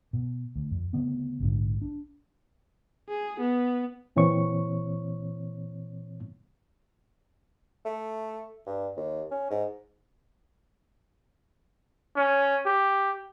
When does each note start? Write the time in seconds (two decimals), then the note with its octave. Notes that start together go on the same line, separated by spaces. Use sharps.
0.13 B2
0.56 D2
0.71 F2
0.93 D2 C#3 B3 C4
1.40 A#1 G#2 D3
1.81 D4
3.09 G#4
3.40 B3
4.16 D2 A#2 E3 C4 C#5 C#6
7.85 A3
8.66 G2
8.97 D#2
9.32 C#4
9.50 G#2
12.16 C#4
12.66 G4